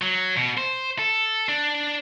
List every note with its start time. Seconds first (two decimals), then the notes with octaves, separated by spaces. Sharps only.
0.02 F#3
0.37 B2
0.58 C5
0.99 A4
1.49 D4